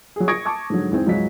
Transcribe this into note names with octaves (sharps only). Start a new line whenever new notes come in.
F#3 G#4
C#6 D#6 G#6 A#6 D7
A5 C#6 D6 G#6
G#2 D3 F#3
E2 G#2 C4
C#2 G#2 F#3 D#4 B6